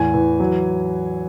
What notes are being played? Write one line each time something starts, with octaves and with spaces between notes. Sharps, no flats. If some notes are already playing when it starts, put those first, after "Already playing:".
Already playing: E2 A2 G#5
E3
F#3